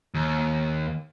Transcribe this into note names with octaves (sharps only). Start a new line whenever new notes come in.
D#2